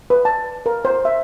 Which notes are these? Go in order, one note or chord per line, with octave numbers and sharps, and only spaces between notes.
B4
A5
A#4
C5
E5